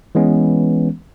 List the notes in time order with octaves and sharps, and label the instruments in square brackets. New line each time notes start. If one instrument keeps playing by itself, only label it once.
[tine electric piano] E3 G#3 B3 C#4